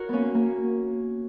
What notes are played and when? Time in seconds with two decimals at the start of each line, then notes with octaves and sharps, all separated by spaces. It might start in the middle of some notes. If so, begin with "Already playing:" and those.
Already playing: F#4 A#4 C#5
0.09 A#3 B3 C#4
0.35 A#3